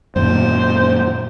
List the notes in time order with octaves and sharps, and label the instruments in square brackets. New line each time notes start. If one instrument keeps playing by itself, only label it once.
[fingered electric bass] F#2 A#2 D#3 [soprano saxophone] C5